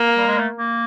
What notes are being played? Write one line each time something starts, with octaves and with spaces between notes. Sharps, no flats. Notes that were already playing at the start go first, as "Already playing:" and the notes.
Already playing: A#3
G3
G#3
A3
A#3